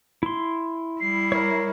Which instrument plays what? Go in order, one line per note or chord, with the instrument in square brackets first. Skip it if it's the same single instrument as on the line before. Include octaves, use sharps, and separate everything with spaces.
[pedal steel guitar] E4 C6
[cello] G3 E4 [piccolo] C7
[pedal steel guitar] A#4 C#5